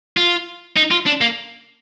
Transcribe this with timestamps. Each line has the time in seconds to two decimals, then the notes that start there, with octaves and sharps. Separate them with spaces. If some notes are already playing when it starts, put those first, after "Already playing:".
0.17 F4
0.77 D#4
0.91 F4
1.06 D4
1.21 A#3